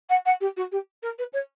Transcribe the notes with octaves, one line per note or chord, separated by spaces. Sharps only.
F#5
F#5
G4
F#4
G4
A#4
B4
C#5